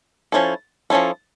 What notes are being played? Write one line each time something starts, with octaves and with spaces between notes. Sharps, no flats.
F3 C#4 E4 A4
F3 C#4 E4 A4